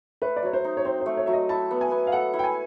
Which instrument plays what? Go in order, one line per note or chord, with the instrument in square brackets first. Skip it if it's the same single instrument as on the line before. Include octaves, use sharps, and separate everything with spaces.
[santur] A3 [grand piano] B4
[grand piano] D5
[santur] F#3 [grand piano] C#5
[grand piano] C5
[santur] D#4
[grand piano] C#5
[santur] C4 [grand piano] C5
[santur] A3 [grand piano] C5
[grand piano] C#5
[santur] F#3 [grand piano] E5
[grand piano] D#5
[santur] E4 [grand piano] A5
[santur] B3
[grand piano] G#5
[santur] B3
[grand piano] F5
[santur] A4 [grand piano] F#5
[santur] E4
[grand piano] G5
G#5